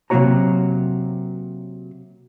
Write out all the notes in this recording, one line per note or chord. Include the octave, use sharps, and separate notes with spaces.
C3 F#3 A#3 F#4 C#5 A#5